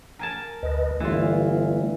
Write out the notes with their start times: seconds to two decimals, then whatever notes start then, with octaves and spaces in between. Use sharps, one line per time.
0.19 A#4 G#5 A5
0.63 D2 B4 D#5
1.00 G1 E3 A3 F4